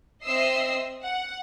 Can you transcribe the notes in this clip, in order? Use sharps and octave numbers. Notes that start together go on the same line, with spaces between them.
C4 D#5 E5 E6 C7
F#5